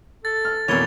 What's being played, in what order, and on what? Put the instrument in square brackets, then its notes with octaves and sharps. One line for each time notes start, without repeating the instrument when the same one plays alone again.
[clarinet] A4 [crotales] A6
[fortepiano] F6
[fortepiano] F2 A#3 [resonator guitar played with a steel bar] B2 E3 [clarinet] C#5 [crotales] F7 G7